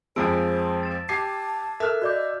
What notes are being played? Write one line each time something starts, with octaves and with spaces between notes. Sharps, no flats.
F2 F3 G#3 C5 A5 E6 D7
A6 E7
G4 A5 D6 G#6 C7 D#7
A4 A#4 E5 F6 F#6
F#4 D5 D#5 D6 F#6 G6